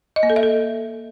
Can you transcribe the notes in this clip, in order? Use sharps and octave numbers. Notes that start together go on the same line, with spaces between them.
D#5
A#3
A4
E5
A4